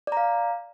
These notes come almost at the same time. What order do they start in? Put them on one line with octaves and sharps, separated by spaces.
D5 A#5 F5